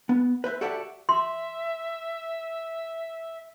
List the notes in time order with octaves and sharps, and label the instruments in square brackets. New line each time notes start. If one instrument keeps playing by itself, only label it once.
[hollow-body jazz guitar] B3
B4 C5 E5
F#4 G4 A4 D5 E5 F#5
[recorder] E5 [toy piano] C6